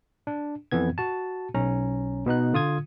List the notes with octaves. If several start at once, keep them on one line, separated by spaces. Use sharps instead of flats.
D4
F2 E3 B3 G#6
F#4 A5
B1 C#4 A#5
B2 B3 D#4 F#6
D3 F4 D#6 G#6